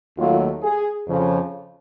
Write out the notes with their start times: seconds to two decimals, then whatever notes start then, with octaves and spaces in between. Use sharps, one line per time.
0.18 D#2 D#3 F#3 A3 F4
0.63 G#4
1.07 F2 C#3 F3